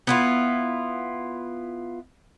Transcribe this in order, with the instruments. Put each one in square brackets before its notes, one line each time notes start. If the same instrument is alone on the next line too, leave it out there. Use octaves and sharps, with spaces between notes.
[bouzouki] B3 E4 F4